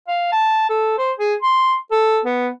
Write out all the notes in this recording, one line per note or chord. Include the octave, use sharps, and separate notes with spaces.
F5
A5
A4
C5
G#4
C6
A4
B3